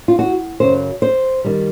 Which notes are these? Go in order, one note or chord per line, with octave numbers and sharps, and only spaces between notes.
F4
F#4
F#2 C#3 F#3 C5
C5
D#3 G3